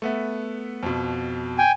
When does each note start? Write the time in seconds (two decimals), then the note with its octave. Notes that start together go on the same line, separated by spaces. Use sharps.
0.02 A3 B3 E5
0.83 F2 B2
1.58 G5 G#5